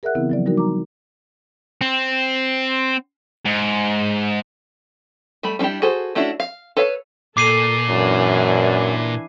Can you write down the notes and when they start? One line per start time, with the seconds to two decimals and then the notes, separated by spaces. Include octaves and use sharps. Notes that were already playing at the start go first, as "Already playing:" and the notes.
0.03 G#4 A#4 D5 E5 F#5 F#6
0.15 C#3 E3 B3 C4 E4
0.30 F3 F#3 D5
0.46 F3 G3 D#4 F#4 A#4
0.57 A#5 D6
1.81 C4
3.45 G#2
5.43 G3 A3 B5
5.59 G3 C#4 D4 E4 G4
5.82 F#4 G#4 A4 C5
6.15 A3 C#4 D4 E4 F#4
6.40 F5
6.77 A4 B4 C#5 F5
7.37 A#2 A4 D6 C7 D#7
7.89 F#2 E3 D4 G#5